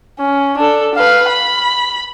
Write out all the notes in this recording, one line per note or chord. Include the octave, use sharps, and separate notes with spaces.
C#4
D4 A4
B4 F5
B5